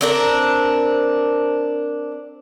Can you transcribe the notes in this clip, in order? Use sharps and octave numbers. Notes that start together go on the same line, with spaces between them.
C4 D4 A#4